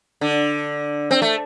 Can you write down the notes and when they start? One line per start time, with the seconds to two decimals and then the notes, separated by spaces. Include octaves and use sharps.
0.21 D3
1.11 C4
1.22 A3